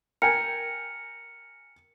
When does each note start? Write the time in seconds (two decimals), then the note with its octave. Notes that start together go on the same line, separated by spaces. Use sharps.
0.22 A#4 G5 G#5 C#7